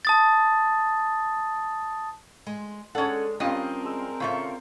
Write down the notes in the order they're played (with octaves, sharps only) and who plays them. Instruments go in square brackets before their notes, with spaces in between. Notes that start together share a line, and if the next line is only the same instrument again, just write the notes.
[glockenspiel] A5 D#6 A6
[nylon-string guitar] G#3 [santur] C6
[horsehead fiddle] G#3 [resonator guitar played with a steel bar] C#4 F#5 [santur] D4 [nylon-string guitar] A4 C#5
[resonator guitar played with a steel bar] G2 F4 D#5 [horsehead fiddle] C4 A#4 [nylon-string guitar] C#4 [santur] G4
[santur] G#3 E6
[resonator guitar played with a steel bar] C#3 A4 [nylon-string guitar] C#4 F4 E5 [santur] C5 F5 C#6